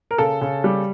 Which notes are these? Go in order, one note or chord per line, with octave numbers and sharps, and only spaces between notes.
A#4
C#3 A4
C#3
G3